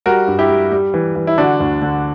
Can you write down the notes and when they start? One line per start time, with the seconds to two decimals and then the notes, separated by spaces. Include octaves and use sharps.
0.06 G3 F#4 A#4
0.28 G2
0.39 E4 G4
0.49 G3
0.72 G3
0.94 E3
1.16 E3
1.27 E4
1.38 D3 D4 F#4
1.60 D2
1.82 D3